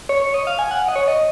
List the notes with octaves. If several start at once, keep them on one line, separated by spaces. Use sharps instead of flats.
C#5
C#5
D#5
F5
G#5
F#5
D#5
C#5
D#5